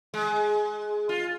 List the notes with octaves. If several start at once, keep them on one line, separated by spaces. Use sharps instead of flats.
G#3
F4